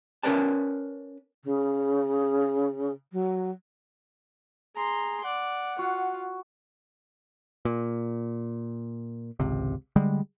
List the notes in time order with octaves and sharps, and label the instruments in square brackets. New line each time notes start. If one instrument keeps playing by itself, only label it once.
[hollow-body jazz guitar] C#4 A#4 B4 D5 A5
[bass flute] C#3
F#3
[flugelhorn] G#4 [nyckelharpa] A#5 C6
[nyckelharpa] D5 [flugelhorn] F#5
[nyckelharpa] F4 [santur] F#4
[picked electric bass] A#2
G#1 C#2 C3
D3 G3 G#3